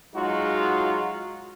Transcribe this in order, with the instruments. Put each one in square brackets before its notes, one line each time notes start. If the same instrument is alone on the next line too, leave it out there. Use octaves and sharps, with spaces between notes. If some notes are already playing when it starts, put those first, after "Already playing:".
[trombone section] F#3 G#3 D#4 F4 F#4